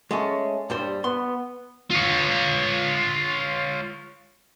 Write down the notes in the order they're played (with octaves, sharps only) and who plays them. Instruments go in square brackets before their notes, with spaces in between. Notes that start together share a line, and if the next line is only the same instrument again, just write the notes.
[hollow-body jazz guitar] G#3 A3 C#4
G2 G3 C5
[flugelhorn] B3 [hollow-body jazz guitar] C6
[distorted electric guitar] F4 C#5